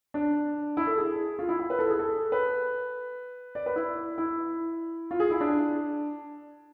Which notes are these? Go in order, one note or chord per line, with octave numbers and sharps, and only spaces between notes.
D4
E4
A4
G#4
F4
E4
E4
B4
A4
G#4
A4
B4
D5
B4
E4
E4
F4
G#4
E4
D4